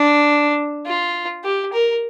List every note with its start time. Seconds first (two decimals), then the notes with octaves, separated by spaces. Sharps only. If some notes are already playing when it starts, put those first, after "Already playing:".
Already playing: D4
0.86 F4
1.44 G4
1.73 A#4